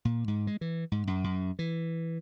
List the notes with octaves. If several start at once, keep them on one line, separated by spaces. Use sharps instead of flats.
A#2
G#2
G#3
E3
G#2
F#2
F#2
E3